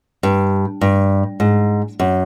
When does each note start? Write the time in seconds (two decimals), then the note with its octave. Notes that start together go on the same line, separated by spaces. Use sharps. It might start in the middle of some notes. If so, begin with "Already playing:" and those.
0.23 G2
0.81 G2
1.40 G#2
2.00 F#2